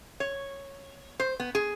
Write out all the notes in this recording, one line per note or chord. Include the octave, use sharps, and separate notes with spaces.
C#5
C5
B3
G#4